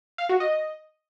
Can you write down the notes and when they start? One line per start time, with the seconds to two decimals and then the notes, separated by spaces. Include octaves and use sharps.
0.18 F5
0.29 F#4
0.40 D#5